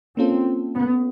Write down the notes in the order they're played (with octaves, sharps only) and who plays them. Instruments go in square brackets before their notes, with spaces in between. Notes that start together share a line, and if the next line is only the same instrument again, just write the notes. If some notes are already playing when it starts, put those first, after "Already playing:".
[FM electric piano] A#3 C#4 F4 A4 [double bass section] C4
[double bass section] B3